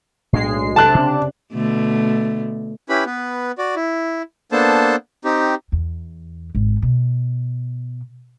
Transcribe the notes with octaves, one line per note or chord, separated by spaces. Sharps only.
B1 A2 G#3 D4 C7
C3 D4 A5 F#6
C#3 C4
B2 D3 A3
C#4 E4 G4 B4 B5
B3 B4
F#4 D5
E4
A#3 B3 D4 A4 C5 A5
C4 D#4 G4
E2
G#1
B2